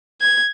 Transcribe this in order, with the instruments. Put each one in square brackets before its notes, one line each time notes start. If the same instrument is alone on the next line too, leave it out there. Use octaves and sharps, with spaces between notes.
[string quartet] G#6